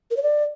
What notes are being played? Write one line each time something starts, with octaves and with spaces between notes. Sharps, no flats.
A#4
C#5
D5